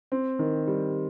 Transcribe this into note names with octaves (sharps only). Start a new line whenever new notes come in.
C4
D#3
G3